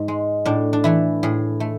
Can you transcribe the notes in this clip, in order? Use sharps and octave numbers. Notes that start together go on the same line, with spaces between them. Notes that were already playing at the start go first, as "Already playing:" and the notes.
Already playing: G#2
G#3
A2 D4
D4
E3 A3 E4
A2 G#4
A3